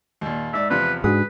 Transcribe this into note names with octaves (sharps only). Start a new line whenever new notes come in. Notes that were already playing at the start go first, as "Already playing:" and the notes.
D#2 A#2
G#2 D5 E5
E2 C3 F3 B4
G#2 D4 F#4 G#4 B4 D#6